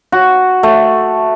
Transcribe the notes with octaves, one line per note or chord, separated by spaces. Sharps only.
F#4
A3